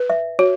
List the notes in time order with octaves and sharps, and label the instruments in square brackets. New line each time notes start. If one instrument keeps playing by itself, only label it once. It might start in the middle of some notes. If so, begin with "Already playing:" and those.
Already playing: [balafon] B4
[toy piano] E5
[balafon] F#4 [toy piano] C#5